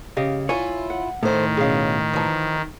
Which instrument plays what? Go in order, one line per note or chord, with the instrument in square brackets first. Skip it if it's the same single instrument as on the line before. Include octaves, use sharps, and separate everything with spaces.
[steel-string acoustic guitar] C#3 [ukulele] G4 D#5 F5
[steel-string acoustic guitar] E4 F4 [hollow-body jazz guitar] C#5 [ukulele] G#5
[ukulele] F#5
[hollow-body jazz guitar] A2 [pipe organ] D#3 [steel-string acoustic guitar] A4 C5
[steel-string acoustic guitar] B2 C#4 [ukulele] G#4 F5
[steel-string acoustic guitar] E3 F3 [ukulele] D#4 A5